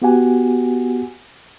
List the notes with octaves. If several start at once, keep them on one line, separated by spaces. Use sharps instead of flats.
B3 F#4 G4 F#5 G#5